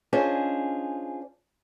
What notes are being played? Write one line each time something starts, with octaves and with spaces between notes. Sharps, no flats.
C#4 D4 F4 G#4 C5 D#5